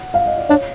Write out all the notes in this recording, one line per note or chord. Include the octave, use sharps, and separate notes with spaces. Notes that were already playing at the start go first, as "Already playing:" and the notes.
Already playing: F#5
F5
D#5
D5
D4 C#5